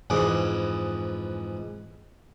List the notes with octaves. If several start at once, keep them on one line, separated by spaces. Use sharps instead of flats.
F2 G#2 E3 G#3 D6